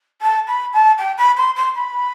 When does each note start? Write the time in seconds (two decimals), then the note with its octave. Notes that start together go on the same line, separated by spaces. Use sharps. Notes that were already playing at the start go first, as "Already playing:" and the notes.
0.21 A5
0.47 B5
0.73 A5
0.98 G5
1.18 B5
1.37 C6
1.56 C6
1.75 B5